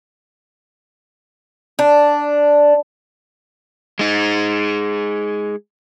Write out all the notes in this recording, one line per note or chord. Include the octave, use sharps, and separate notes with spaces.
D4
G#3 D#4